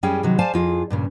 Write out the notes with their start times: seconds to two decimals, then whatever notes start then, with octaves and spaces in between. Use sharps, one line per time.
0.03 F#2 G3 C#4 G#4 G5
0.23 C3 D#3 F#3
0.39 C5 D5 F5 G#5 A5
0.54 F2 F4 G#4
0.90 G2 A#2 C#3